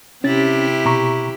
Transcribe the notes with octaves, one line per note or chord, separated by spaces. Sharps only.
C3 C#4 E4 G4 A6
B2 A#5 C#6